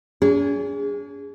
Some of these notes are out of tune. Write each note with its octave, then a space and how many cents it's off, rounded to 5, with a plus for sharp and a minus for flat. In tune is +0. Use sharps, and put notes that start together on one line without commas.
C#4 +45 G#4 -15